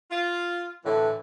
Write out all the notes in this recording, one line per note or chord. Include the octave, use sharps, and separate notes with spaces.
F4
A2 D3 E3